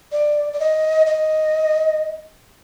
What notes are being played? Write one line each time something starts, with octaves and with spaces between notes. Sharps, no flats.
D5
D5
D#5
D#5